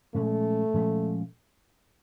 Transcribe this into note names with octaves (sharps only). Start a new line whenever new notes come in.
A#2 F3 G#3 A3 C#4
A#2 F3 G#3 C#4